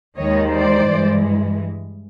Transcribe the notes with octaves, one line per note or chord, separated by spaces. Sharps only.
D#2 D#3 G#3 C#5 D#5
C5 D5
G2 E3 G#3